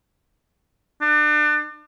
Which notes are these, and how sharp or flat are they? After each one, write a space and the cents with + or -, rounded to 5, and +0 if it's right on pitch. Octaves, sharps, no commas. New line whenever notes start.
D4 +35